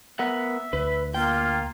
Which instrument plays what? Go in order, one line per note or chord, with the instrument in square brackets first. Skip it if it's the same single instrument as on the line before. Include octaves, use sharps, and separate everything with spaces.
[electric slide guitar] B3 A#4 F#5 [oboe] E5
[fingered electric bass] D2 [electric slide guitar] B4
[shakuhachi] A#3 [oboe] F4 [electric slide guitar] G5